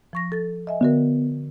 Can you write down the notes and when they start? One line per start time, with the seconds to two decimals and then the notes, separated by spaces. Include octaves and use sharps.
0.13 F3 C#6 A#6
0.32 A4 A6
0.67 D#5 E5 G#5
0.81 D3 B3 F#4 A#4